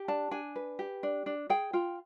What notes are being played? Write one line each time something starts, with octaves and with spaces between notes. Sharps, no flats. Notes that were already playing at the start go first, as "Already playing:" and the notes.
Already playing: G4
D4 A5
D4 G#5
B4
G4
D4
D4
G#4 G5
F4 G5